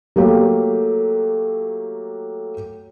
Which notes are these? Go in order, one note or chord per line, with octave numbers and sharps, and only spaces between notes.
F#3 A3 A#3 G4